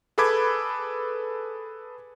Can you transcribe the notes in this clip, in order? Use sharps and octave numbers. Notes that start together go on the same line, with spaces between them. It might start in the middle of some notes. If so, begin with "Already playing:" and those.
G#4 A4 B4 B5 D6 G#6